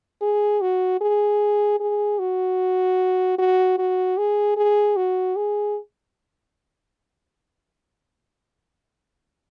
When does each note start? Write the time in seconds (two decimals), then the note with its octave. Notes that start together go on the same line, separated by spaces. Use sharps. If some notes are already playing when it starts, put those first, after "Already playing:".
0.22 G#4
0.61 F#4
1.01 G#4
1.80 G#4
2.19 F#4
3.38 F#4
3.78 F#4
4.18 G#4
4.57 G#4
4.96 F#4
5.36 G#4